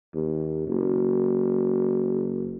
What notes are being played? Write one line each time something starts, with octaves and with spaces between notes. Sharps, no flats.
D#2
F#1